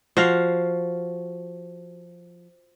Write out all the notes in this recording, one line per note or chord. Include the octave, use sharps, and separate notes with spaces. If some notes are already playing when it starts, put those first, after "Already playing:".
F3 F#4 F5